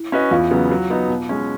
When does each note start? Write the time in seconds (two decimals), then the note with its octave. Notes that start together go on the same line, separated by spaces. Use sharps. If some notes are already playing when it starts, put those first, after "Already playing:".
Already playing: E4
0.12 C#4 F#4 B4 D#5
0.31 E2 F4 F5
0.51 C#3 F#3 B3
0.71 F#3
0.90 B3 D#4
1.09 B2
1.29 G#3 C#4